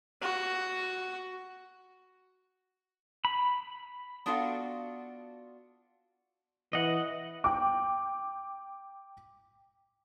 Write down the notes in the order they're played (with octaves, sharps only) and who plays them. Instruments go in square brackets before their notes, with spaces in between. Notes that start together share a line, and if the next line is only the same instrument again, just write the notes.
[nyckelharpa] F#4
[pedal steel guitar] B5
[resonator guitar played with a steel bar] B3 D4 F4 F#4 A4 F5
[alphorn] E3 [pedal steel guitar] D#5 F#5
[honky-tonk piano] G5 D6